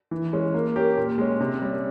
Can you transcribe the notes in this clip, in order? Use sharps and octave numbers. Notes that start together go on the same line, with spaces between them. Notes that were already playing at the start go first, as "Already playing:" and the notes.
E3
G#3 C#4
A#3
C#4 G4 A#4
A#2
G#3 C#4
C3
G3 C#4